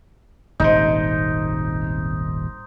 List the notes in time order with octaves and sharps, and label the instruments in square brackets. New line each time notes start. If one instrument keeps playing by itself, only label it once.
[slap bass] D#1 G#1 C3 [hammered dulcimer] D#4 C5